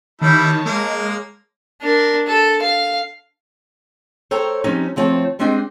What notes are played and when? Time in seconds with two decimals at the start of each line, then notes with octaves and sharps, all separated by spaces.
0.22 D#3 G3 E4 C#5 A5
0.66 G#3 A#3 A#4
1.82 D4 A#4
2.27 A4
2.62 F5
4.31 A4 C5 C#5 G5 A#5
4.64 F3 G3 C4 C#4 D#4
4.96 D2 F3 C4 C#5 A5
5.39 G3 G#3 C4 D4 D#5 G5